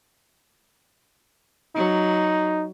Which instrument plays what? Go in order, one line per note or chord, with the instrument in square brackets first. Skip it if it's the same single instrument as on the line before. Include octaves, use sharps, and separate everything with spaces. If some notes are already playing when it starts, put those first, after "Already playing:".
[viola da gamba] F#3 [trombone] D#4